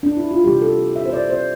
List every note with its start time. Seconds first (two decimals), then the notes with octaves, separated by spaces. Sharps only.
0.03 D4
0.17 E4
0.31 F4
0.44 C3 E3 G3 G4
0.61 A4
0.96 E5
1.05 C5
1.13 D5
1.30 C5